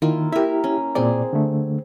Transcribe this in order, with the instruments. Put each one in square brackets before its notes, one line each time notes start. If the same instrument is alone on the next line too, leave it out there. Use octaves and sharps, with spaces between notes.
[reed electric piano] D#3 [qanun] A#3 E4 F4
[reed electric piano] E4 G4 [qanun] A#4 E5
[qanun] C#4
[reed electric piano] A#2 D5 [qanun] C4 G#4
[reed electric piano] D3 A3